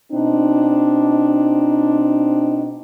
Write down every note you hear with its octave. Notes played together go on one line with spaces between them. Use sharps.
B2 C4 D4 D#4